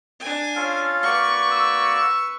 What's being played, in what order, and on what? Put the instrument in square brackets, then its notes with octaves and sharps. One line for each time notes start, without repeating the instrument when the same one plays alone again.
[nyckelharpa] D4 G#5
[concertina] C#4 F4 A4 [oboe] F5
[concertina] A#3 F#4 D5 [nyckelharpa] B4 C#6
[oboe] E6